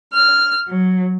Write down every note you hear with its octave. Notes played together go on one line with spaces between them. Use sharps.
F6
F#3